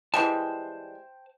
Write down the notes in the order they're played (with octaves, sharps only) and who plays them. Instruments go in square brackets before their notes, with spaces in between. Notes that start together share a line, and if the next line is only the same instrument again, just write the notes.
[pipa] E3 G3 G#3 [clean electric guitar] C5 G5 A5